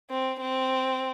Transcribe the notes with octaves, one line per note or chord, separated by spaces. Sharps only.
C4
C4